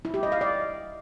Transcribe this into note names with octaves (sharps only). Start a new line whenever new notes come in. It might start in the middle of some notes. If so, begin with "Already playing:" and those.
E4
G4
D#5
F5
D5